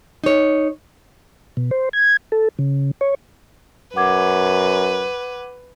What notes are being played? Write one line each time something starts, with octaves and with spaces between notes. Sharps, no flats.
D#4 C#5
B2
C5
G#6
A4
C#3
C#5
F#2 B4 F#5 D6 G#6